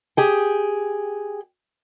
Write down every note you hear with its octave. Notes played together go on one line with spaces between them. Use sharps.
G4 G#4 G5